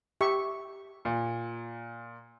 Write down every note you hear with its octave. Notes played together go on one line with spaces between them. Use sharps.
G4 E5 C#6
A#2